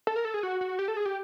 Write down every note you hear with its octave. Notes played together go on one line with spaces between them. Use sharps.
A4
A#4
A4
G#4
F#4
F#4
G4
A4
G#4
G4